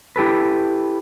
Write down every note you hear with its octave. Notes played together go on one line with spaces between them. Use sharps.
E4 G4 A4 B4